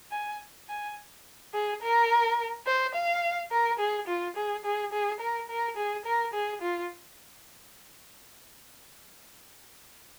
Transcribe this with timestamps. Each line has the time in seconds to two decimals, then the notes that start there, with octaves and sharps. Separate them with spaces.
0.12 G#5
0.69 G#5
1.54 G#4
1.82 A#4
2.67 C5
2.94 F5
3.51 A#4
3.79 G#4
4.07 F4
4.36 G#4
4.65 G#4
4.92 G#4
5.20 A#4
5.49 A#4
5.77 G#4
6.05 A#4
6.34 G#4
6.61 F4